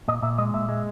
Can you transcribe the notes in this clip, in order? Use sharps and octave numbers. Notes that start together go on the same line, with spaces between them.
A#2 D#5
A#2 E5
G#3 D#5
A#2 E5
G#3